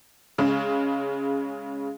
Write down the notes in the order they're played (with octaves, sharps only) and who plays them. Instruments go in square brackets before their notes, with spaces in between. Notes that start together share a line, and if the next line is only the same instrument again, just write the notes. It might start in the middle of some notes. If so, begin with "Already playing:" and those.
[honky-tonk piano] C#3 G#3